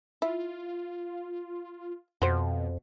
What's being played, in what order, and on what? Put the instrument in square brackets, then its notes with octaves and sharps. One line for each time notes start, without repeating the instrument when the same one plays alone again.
[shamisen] E4 [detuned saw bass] F4
[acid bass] F2 [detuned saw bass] B2 [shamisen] F#4 C5